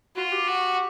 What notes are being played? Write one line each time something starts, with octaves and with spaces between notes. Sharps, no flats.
F4 F#4
G4
F#4